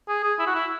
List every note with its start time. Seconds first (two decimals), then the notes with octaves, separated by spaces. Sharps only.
0.08 G#4
0.24 G#4
0.39 E4
0.47 F#4
0.55 E4